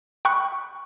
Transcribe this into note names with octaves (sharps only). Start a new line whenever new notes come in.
G5 B5 C#6 F#6